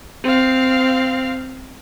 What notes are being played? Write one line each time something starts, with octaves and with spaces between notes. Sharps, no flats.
C4 F5